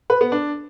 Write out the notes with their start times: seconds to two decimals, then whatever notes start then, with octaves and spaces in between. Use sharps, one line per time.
0.10 B4
0.21 B3
0.32 D4